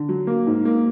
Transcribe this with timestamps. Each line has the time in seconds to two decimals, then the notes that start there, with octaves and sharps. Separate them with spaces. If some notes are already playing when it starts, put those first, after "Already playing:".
Already playing: D3
0.09 F#3
0.27 A#3
0.47 G#2
0.65 A#3